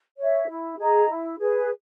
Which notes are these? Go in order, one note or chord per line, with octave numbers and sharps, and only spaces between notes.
C#5 E5
E4
G#4 D#5 A#5
E4
G#4 B4